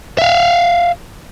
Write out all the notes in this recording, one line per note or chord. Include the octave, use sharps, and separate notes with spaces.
E5 F5